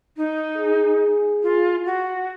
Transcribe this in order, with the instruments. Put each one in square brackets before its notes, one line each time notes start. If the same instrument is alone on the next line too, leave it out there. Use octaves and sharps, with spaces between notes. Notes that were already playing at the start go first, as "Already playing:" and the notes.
[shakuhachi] D#4
[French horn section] G#4
[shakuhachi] F4
F#4